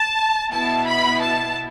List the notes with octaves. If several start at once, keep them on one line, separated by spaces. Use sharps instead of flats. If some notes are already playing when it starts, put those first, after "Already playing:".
Already playing: A5
B2 B3 E4 A5
B5
A5